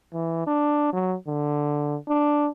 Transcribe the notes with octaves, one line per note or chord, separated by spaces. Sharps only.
E3
D4
F#3
D3
D4